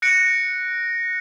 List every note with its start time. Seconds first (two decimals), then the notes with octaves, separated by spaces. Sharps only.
0.02 F#6 A#6 C#7 D7